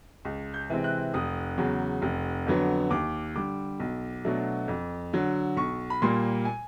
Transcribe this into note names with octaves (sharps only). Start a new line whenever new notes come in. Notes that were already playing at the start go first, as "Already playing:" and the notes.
C#2
G6
C3 E3 G#3 C4
F#6
F1 D#6
E2 C#3 F#3
F1
F2 D3 F#3 B3
D#2 D6
D3 G3 D6
B1
B2 F#3 A3 D4
F2
D3 F#3
B1 C#6
B5
A#2 G3 A#3 C6
G#5